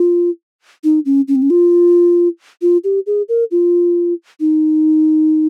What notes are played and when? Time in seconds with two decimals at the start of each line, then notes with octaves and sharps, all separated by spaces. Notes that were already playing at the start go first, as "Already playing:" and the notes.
Already playing: F4
0.84 D#4
1.05 C#4
1.28 C#4
1.35 C4
1.42 C#4
1.50 F4
2.62 F4
2.84 G4
3.07 G#4
3.29 A#4
3.51 F4
4.40 D#4